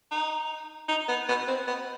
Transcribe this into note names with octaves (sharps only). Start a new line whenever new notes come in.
D#4
D#4
B3
B3
C4
B3